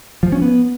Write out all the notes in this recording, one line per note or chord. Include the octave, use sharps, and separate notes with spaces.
F3
C#4
B3